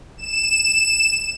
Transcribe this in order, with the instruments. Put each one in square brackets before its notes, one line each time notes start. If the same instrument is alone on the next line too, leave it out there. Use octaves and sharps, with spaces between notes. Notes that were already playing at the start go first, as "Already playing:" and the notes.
[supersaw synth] E7